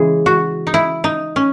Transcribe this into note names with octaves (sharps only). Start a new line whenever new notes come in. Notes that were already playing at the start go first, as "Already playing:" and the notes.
Already playing: C#3 E3 G#3 G#4
F#4
D#4
E4
D#4
C#4